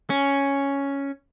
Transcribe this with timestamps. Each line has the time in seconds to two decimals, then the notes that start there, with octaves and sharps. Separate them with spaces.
0.10 C#4